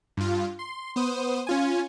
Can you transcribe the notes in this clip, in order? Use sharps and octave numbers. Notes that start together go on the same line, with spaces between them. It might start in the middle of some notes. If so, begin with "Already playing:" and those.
G2 F4
C6
B3 C5 D#6
C#4 F4 G#5